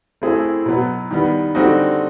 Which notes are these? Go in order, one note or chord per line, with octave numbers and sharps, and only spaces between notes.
A3 C4 E4 G#4
B2 F#3 B3
D#3 G3 B3
D3 G3 C4 D#4 F#4